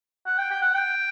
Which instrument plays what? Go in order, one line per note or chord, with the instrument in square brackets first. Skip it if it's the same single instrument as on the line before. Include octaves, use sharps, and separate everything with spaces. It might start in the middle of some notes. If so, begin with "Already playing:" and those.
[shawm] F#5
G5
G5
F#5
G5